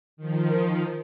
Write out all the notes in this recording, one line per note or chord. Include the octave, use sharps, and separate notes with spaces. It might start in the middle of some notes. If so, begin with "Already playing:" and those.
D#3 F3